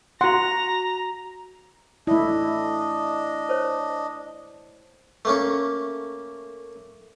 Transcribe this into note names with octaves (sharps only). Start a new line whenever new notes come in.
F#4 F#5 A#5 C6
A3 D4 E4 D#5
A#4 C5 C#5
A3 A#3 C#4